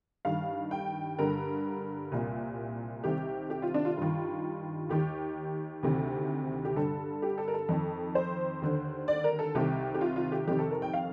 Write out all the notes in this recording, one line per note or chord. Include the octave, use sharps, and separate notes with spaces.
G2 D#3 F5
G5
G2 D3 A#4
C2 A#2
C2 C3 D#3 G4
G4
F4
D4
F4
G2 D#3
D#2 D#3 G4
D2 C3 D#3
G4
G2 D3 A4
G4
A4
A#4
A4
F2 D#3
C5
D#2 D3
D5
A#4
A4
C2 C3 D#3 G4
G4
F4
F4
G4
F2 C3 D#3 G4
A4
A#4
G5
F5